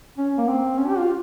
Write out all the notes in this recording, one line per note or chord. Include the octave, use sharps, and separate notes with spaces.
C#4
A#3
C4
C#4
G4
F4